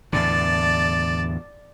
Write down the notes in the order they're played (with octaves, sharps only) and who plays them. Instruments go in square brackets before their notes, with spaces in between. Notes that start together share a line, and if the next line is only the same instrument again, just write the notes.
[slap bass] E2 A2 D3 [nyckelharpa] D5 A5